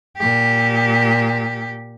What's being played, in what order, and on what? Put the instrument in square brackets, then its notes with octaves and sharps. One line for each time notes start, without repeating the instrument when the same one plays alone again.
[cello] A#2 G4